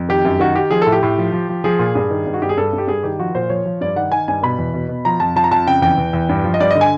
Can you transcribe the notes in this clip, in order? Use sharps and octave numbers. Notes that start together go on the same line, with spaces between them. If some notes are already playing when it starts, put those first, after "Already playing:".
Already playing: F2
D#3 G4
F#2
D#3 F#4
D#3 G4
F3 G#4
A2 A4
G4
A2
F3
F3
F3
F3 G#4
A#2
G2 G#4
D#3
G2
F#4
G2 G4
G#4
G2 A4
G2
G4
G2 G#4
D#3 G4
F3 F#4
A#2 C5
F3 C#5
F3
G2 D5
D#3 F#5
D#3 G#5
G2 G#5
B2 B5
E2
B2
B2
F3 A#5
F2 A5
F3 A5
A#5
F2 A5
C#3 G5
E2 G5
E2
E2
G2
F3
D#5
G2 D5
D3 D#5
G#5